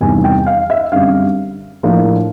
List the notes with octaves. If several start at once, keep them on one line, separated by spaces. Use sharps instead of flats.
F1 E2 C3 D#3 G3 G#5
G5
F5
E5
F#2 D3 G3 C4 F5
A2 F3 A#3 D4